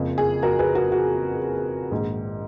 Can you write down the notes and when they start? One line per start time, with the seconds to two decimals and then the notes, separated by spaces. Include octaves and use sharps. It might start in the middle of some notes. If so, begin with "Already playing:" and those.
Already playing: F#1 F2 F3
0.18 G#4
0.43 F#4 A#4
0.59 G#4 B4
0.75 F#4 A#4
0.92 F#4
1.91 A#1 G#2 D#3